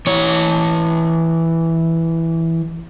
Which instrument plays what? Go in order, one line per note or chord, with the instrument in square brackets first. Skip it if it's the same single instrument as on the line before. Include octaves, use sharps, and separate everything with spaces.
[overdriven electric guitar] E3 C#5